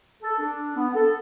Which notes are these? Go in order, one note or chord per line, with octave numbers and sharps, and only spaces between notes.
A4
D4
B3
A4